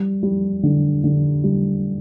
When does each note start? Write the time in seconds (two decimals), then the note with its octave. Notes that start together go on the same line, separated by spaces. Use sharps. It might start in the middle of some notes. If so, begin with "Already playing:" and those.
Already playing: G3
0.23 G3
0.63 D3
1.04 D3
1.44 G3